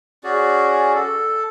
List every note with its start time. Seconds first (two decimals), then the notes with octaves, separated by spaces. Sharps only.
0.24 C#4 F#4 G#4 D5
0.95 A4